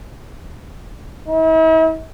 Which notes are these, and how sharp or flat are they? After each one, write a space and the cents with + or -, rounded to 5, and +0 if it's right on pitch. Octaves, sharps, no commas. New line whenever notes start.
E4 -45